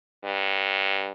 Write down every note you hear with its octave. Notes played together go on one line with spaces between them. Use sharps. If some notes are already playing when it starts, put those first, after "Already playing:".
G2